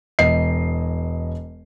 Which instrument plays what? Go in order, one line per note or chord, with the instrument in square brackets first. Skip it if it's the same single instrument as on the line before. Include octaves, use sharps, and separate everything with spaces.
[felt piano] E1 D#5 C7